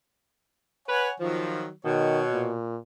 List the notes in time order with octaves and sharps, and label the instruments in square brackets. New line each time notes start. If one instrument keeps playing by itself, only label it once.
[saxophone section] B4 [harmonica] C#5 F#5 G#5
[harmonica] D#3 F#3 [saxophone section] F3
[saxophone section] B2 [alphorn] D#3 [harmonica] C#5
[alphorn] A#2